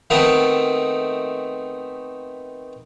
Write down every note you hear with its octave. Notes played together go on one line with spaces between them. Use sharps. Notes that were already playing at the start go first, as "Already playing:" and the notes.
D#3 A3 B3 C4 D#4